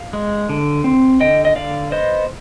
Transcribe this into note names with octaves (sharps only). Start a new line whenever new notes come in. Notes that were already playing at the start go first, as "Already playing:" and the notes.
Already playing: F5
G#3
D3
C4
D3 D#5 G5
D#5
D3 D5 F5
B3 C5 D#5